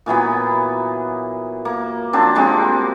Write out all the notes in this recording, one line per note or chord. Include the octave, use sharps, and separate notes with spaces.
A#2 E3 F#3 B3
A#3
F3 F#3 C4 D4
G3 G#3 C4 F#4